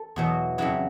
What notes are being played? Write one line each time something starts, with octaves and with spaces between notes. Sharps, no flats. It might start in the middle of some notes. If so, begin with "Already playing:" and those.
Already playing: A4
E2 B2 F#3
F2 C#3 F#3 E4